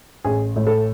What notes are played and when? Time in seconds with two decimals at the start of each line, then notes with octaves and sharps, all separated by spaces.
0.24 A1 G#4
0.56 A2
0.67 A4